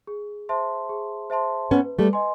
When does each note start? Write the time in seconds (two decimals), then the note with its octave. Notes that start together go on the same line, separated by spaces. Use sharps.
0.07 G#4
0.49 C5 E5 A5 C6
0.89 G#4
1.30 C5 E5 A5 C6
1.71 B3 C#4 B4
1.99 G3 A3
2.13 D#5 G#5 C6